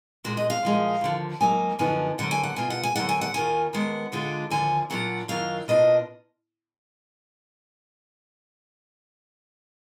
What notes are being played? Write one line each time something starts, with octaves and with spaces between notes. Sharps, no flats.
A#2 G#3 D4 F#4
D#5
F5
A#2 F3 G#3 D#4
D#2 D3 F3
G#2 F#3 A#3 D#4 G#5
F#2 D3 F3 B3 D#4 G#5
D2 D3 F#3 A#3 F#5
G#5
F#5
B2 A#3 F4 G#5
F#5
G#5
D3 F#3 A#3 D4 F#5
G#5
F#5
D#2 D#3 A#3 F4 G#5
D#2 D#3 G#3 B3 D4 F#5
D2 D3 G#3 D4 F4
D#2 D3 F3 G#5
A#2 F#3 D4 F4 F#5
F#2 D#3 F#3 D4 F4 F5
B2 A#3 D4 F4 D#5